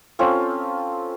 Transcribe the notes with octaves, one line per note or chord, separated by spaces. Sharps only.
C4 C#4 F4 A4